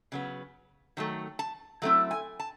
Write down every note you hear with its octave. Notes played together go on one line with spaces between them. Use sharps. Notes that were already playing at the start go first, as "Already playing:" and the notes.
C#3 F#3 B3
D#3 F#3 A3
A5
F#3 A3 C4 E4
G#5
A5